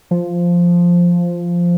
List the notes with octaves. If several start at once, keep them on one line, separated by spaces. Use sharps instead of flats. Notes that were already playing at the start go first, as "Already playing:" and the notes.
F3